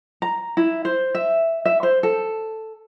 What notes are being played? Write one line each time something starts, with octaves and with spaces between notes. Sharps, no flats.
A#5
E4
C5
E5
E5
C5
A4